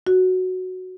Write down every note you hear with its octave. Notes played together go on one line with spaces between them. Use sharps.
F#4